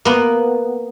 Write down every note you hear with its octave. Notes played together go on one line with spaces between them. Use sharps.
A#3 B3